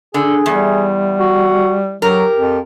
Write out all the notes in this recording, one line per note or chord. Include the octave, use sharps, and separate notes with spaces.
D3 G#4
E2 G3
F#4
F#3 G4 A#4
F2